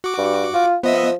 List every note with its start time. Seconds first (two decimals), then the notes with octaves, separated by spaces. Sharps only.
0.04 F#4 D6
0.18 G2
0.54 F4
0.83 F3 B3 D#5 E5